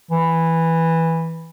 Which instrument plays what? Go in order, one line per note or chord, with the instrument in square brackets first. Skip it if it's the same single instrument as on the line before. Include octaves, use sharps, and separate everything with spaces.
[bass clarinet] E3